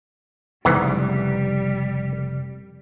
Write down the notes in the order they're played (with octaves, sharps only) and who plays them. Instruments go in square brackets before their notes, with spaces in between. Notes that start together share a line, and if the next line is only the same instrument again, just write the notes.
[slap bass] F1 C#3 [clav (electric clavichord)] E2 G#2 E3 [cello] G3